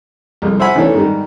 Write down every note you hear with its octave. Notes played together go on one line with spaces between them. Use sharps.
C2 F2 G#3
C5 E5 F#5 G#5 B5
D#3 E3 A3 C#4 D4 A4
G#2 D#3 G3